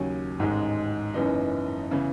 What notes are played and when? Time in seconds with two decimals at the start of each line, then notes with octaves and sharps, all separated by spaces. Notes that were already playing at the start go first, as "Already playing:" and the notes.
Already playing: D#2 C#3 F#3 C#4
0.39 A1 G#2 D#3 G#3
1.14 F#1 F#2 E3 B3 D#4
1.91 C#3 E3 B3